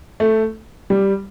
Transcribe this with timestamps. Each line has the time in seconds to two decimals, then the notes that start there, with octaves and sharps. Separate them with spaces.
0.20 A3
0.90 G3